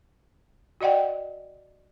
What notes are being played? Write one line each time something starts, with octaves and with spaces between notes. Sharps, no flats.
F#4 D5 D#5 F#5 G5